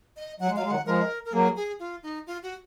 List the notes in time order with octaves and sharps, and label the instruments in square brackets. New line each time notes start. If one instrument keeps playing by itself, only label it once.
[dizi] D#5
[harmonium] F#3 [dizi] F#5
[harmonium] G#3
[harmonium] F#3 [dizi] F5
[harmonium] G#3
[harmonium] D#3 F#3 [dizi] F#5
[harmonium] F3 G#3 [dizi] A#4
[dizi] A#4
[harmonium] F#3 A#3 [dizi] G#4
[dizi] G#4
F4
D#4
F4
F#4